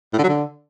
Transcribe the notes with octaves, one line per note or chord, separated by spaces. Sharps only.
A2
D3
F#3
D3